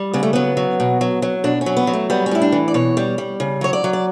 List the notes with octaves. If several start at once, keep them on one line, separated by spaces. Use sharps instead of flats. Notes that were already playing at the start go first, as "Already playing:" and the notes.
Already playing: G3
C#3 B3
A3
F#3 B3
F#3
B2
F#3
F#3
B2 D4
C#4
F#3
B3
F#3
A3
G3 B3
C#4
A2 E4
D4
E3
D5
B2 C#5
G3
G3
C#3
F#3 C#5
D5
F#3
D5